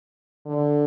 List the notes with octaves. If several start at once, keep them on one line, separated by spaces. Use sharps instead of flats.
D3